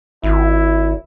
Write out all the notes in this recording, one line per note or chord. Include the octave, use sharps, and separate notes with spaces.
G#1 E4